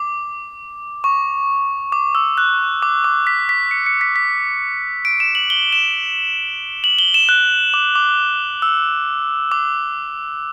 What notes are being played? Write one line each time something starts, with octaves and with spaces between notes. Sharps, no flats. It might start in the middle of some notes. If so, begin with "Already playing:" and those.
Already playing: D6
C#6
D6
E6
F#6
D6
D6
B6
B6
C#7
C#7
B6
B6
D7
E7
F#7
G7
E7
F#7
G7
E7
F#6
D6
D6
E6
D6